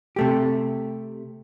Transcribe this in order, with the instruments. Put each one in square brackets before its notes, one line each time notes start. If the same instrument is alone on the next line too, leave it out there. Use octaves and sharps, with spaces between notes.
[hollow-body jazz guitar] C3 A3 G4